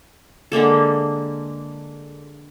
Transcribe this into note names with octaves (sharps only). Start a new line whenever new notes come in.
D3 G#3 A#3 A4